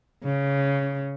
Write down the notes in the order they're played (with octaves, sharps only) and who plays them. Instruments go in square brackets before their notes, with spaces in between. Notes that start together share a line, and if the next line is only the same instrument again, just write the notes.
[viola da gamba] C#3